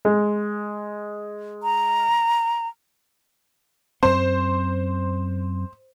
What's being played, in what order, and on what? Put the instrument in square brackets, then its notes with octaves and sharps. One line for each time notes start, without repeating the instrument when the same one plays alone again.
[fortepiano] G#3
[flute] A#5
[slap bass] F#2 C4 [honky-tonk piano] C5